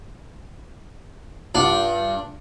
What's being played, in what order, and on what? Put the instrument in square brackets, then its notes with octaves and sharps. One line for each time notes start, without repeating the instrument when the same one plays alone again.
[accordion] G2 [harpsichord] D4 [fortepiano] F4 F#5